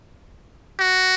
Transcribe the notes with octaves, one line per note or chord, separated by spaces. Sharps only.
F#4